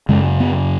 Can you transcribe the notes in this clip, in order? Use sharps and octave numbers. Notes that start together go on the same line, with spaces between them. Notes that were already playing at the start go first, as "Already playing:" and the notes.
F#2 C#3 G#3
B3